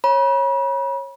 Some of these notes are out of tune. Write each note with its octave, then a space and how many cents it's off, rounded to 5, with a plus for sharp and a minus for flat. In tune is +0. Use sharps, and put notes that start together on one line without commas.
C#5 -20 B5 -40